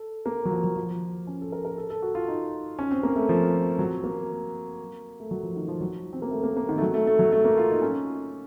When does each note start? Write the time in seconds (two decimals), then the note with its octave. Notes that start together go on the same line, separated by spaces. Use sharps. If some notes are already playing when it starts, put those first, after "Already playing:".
Already playing: A4
0.26 A#3
0.45 F#3
0.51 F3
0.64 F#3
0.76 F3
1.27 C#4
1.41 A4
1.52 A#4
1.65 A#4
1.78 A4
1.90 A4
2.02 F#4
2.15 F4
2.28 D#4
2.79 C#4
2.91 C4
3.03 A#3
3.16 A3
3.29 F3
3.79 F#3
4.04 A#3
5.20 A3
5.31 F#3
5.43 F3
5.56 D#3
5.68 F3
5.81 F#3
6.13 C4
6.22 A#3
6.31 A3
6.44 A#3
6.57 A#3
6.69 D#3
6.78 A3
6.82 F#3
6.94 A3
7.07 A3
7.19 F#3
7.32 A3
7.45 A#3
7.58 F4
7.70 D#4
7.82 C#4